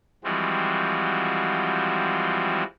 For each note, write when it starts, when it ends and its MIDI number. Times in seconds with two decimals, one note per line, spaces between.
0.24 2.64 52
0.24 2.64 53
0.24 2.64 55
0.24 2.64 56
0.24 2.64 60
0.24 2.64 66